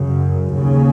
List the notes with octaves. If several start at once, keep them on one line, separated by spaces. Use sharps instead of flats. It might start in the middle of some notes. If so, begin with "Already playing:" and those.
Already playing: F#2 C#3
D#2 C#3